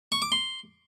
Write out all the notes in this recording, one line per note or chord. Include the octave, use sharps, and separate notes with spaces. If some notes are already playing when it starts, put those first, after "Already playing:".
C#6
D6
C6